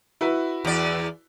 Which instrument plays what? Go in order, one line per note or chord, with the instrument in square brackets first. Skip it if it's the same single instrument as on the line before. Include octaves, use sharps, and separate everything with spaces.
[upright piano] E4 F#4 B4
[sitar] E2 D5